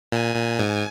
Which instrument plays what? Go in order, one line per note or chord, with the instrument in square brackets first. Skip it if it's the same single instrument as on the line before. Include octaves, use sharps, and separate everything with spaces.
[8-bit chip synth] A#2 [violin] G#5
[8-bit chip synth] A#2
G#2